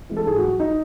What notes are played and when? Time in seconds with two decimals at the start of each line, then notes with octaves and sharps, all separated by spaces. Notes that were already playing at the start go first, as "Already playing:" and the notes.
0.09 E3 G#3
0.17 A4
0.26 G#2 G#4
0.38 F#4
0.43 F#3
0.60 D#4